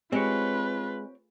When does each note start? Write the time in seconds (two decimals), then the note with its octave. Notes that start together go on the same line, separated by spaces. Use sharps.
0.12 G#3 C4 F4 G4 B4 C#5